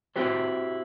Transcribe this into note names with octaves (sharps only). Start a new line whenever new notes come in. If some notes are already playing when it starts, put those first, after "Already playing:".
C4 E4 F#4 G4 C5